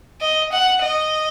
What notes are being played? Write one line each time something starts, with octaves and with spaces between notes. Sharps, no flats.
D#5
F#5
D#5